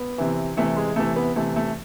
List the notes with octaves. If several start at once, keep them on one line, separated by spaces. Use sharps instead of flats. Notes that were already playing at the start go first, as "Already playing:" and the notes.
Already playing: B3
C3 E3
C3 E3 A3
G#3
C3 E3 A3
B3
C3 E3 A3
A3